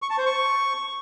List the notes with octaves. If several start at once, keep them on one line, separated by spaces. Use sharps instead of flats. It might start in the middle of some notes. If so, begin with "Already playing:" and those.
C#6
A5
C5
C#6